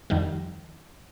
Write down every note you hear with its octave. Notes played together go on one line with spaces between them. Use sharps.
F2 D#3 G3